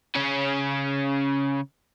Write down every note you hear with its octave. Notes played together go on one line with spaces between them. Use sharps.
C#3 C#4